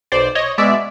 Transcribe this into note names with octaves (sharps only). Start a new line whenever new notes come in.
B1 C5 D5
C#5 D#5
B2 G#3 D5 E5